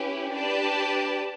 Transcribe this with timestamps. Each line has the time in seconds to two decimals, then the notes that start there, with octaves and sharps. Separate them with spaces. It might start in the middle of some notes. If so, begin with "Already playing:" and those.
Already playing: C#4 E4 G4 B4
0.34 D4 G4 B4 D5 A5